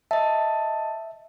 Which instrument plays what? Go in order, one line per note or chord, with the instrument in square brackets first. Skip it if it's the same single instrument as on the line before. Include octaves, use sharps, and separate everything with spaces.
[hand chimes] D#5 A5 [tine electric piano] E5